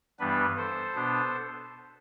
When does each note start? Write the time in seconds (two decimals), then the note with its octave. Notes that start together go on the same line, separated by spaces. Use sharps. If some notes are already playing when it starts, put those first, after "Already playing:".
0.19 G2 E3 G3 B3 D4 B4
0.57 A4 C5
0.95 B2 B3 D4